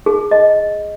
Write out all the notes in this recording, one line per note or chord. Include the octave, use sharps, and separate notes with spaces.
G#4
D#5